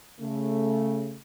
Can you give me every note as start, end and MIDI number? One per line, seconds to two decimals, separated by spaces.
0.20 1.17 49
0.20 1.17 57